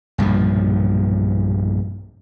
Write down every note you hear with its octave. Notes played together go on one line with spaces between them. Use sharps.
B1 G2 A#2 F3